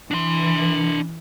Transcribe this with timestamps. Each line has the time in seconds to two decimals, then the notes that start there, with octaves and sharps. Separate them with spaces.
0.11 E3 D4 C6